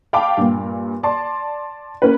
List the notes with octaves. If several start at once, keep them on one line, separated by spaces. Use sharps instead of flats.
F5 G5 A5 B5 D6
G2 A#2
D5 A5 C6
A#3 C#4 A#4 B4